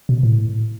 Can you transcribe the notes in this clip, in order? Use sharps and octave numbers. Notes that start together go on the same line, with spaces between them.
B2
A2